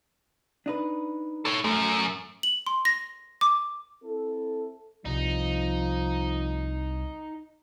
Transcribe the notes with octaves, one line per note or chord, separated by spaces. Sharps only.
D4 D#4 B4
A4 C#5
F#2 A3
F#7
C6
A#6
D6
C4 E4 A4
C2 F3 D#4